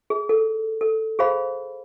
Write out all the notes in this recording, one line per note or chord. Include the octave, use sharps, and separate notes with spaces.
G#4
A4
A4
G#4 C5 F5 B5